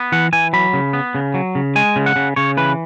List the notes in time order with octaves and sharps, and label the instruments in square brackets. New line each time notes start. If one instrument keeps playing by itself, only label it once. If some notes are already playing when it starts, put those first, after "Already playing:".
Already playing: [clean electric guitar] B3
E3 F#5
E3 G#5
F#3 B5
C#3
B3
C#3
F#3
C#3
G#3 G#5
C#3
F#5
C#3
C#3 C#5
E3 B4